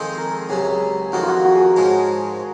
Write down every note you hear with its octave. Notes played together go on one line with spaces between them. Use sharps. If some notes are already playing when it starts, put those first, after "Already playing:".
Already playing: F2 D#3 G#3 C4 D#4 G#4
A#4
C#2 C3 F#3 G#4
F2 D#3 A#3 F#4
F4
F#4
F#4
G#4 A#4
G#2 F3 G#3 C#4